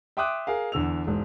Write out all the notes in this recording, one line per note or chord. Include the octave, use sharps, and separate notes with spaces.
E5 G5 C6 D6 D#6 F#6
G#4 A#4 F5
E2 D3 E6 F7
E1 G#2